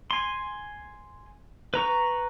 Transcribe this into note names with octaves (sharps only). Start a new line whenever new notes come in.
G#5 C6
B4 A#5 C#6